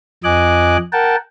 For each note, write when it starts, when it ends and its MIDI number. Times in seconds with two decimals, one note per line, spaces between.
0.24 0.77 41
0.24 0.77 53
0.24 0.77 75
0.24 0.77 80
0.24 0.77 86
0.24 0.77 90
0.93 1.16 70
0.93 1.16 78
0.93 1.16 79
0.93 1.16 81